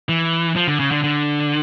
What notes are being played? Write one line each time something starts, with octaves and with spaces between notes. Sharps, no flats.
E3
F3
D3
C#3
D3
D3